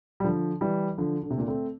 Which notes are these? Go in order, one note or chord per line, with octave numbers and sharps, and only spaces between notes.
G3
D3 F3
E3 G3
D3 F3
D3
C3
A#2 D3
A3 C4